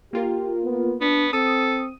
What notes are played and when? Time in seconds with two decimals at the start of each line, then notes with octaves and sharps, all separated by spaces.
0.13 A#3 F4 G4 A#4
0.63 B3
1.01 B3 D4
1.33 C4 A4 D#6 D#7